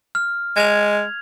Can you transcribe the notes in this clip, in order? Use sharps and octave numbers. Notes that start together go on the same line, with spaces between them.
F6
G#3 G#6 F7